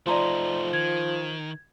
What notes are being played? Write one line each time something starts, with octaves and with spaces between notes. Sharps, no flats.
F3 A3 D#4 D5 A#5 C6
D#3 G#6